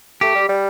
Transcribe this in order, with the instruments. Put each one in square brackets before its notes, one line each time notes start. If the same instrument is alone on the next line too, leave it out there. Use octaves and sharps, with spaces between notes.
[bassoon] A3 [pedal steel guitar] G4
[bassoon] G3
G3